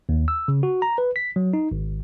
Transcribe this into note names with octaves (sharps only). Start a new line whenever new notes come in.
D#2
E6
C#3
F#4
A#5
B4
B6
F#3
D#4
G#1